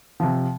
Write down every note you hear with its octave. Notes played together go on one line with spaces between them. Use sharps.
C3 F3